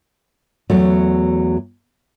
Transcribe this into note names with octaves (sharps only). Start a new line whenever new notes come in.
E2 F#3 A3